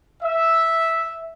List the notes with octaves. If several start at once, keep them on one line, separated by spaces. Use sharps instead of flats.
E5